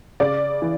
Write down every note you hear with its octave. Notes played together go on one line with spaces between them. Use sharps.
C#3 D5
E3